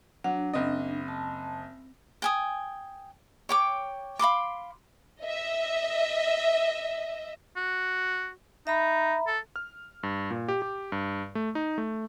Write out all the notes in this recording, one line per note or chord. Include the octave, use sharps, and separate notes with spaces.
F#3 D4 F#5
F#1 C4 D#5
A5
G5 G#5 D#6
C#5 G5 D6
F5 B5 C6 D6
D#5 E5
F#4
D#4 E5 A#5 B5
A4
F6
G2
A#2
G4
G4
G2
A3
D#4
A3